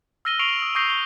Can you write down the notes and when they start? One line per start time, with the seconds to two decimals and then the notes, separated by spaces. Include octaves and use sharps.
0.25 E6 F6 A#6 D#7 G7
0.39 C#6 C7 D7 D#7 F7 F#7
0.59 D#6 F#7
0.75 C#6 D#6 G6 A#6 C7 G7
0.90 C#6 G7